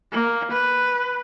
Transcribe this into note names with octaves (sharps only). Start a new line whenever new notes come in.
A#3
B4